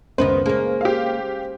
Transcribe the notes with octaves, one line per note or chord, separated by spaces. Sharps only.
C#2 F#2 D#3 B3 B4 C5
C#3 G#3 A#3 C#4
G4 F5